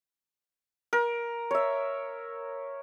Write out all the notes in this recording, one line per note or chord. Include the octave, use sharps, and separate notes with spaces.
A#4
C#5 E5